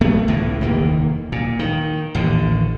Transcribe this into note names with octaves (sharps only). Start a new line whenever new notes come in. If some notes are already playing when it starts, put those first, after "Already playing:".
B1 A3 B3
C#2 A2 E3
F1 D#2 D#3 A#3
A#2
D#3
A1 D#2 D3